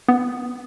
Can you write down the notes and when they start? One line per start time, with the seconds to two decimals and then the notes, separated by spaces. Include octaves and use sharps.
0.09 B3